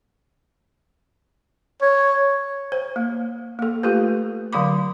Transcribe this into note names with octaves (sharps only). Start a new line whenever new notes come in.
C#5
C5
A#3
A#3 A4
A3 F4 G4 A4 B4
D3 F#3 F5 B5 D6